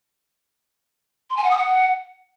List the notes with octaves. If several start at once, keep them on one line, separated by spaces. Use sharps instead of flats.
C6
G#5
F#5
D#6
F#5